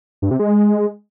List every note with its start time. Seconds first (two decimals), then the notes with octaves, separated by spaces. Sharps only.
0.22 G2
0.31 C3
0.39 G#3